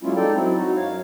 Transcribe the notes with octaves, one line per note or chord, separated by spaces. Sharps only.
F#3 G#3 A#3 C#4 E4 F4
G#3 D#4 A4 D5 G5
F#3 C4 E4
D#4 F#4
F#2 C#5 F5